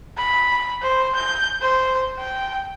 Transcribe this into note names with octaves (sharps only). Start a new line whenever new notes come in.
B5
C5
G6
C5
G5